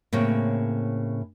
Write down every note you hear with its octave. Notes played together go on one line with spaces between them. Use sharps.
A2 C#3 A#3 C4 C#4